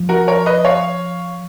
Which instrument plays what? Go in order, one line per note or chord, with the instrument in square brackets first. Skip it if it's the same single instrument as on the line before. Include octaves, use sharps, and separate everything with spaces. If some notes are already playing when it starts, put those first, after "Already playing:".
Already playing: [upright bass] F3
[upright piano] F#4 A#4
A#4 C#5
B4 D#5
C#5 F5